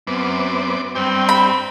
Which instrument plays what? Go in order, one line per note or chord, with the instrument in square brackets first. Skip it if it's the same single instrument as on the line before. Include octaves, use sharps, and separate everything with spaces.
[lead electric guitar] F#2 [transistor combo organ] B3 C4 D6
[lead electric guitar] G2 [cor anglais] C4 [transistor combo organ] G5
[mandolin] B5